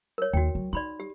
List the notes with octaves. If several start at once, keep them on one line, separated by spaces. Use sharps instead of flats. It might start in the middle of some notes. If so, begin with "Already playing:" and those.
A#4 C#5
D#2 F#4 G5
F#3
D#4 D5 B5 C6
G4